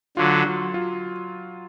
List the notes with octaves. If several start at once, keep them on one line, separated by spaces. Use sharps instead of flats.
D3 F#3 F4
F#3
F4